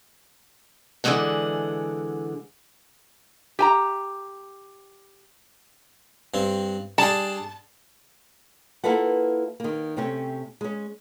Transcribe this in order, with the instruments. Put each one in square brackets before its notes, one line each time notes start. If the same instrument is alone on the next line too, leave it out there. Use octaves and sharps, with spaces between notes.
[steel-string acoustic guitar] D3 E3 F3 G#3 D4 F#5
[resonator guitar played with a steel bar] G4 G#5 A#5
[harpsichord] G2 C4
[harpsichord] G3 D4 G#4 [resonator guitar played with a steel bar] A5
[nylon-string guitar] A#3 E4 F4 A4 B4 F#5
D#3 A#3
C3 A3 C4 C#4
G#3 C#4